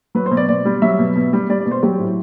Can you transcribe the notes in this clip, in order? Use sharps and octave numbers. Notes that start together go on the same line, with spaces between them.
F#3 B4
C5
B2
D5
B2 D5
G3
F#3 E5
B2
B2
G3
G3 D5
D5
B2
C5
F#3 G4
A2